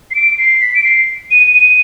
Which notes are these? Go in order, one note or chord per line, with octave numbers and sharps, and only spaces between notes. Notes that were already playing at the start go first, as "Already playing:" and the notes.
C7
D7
C7
B6
D7
C7
D#7
D#7